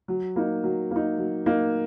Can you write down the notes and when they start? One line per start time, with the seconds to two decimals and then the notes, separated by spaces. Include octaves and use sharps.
0.08 F#3
0.36 A#3 D#4
0.64 F#3
0.91 A#3 D#4
1.18 F#3
1.46 A#3 D#4